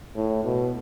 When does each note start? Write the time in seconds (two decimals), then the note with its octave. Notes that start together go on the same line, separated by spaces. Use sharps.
0.16 A2
0.44 B2